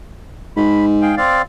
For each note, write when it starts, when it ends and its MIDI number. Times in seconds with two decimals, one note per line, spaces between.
0.57 1.16 44
0.57 0.85 83
1.02 1.15 68
1.02 1.15 77
1.02 1.15 79
1.17 1.42 60
1.17 1.42 74
1.17 1.42 77